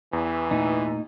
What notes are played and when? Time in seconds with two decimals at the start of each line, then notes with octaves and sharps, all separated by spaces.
0.13 E2 E3
0.51 A#2 A3 A#3 D#4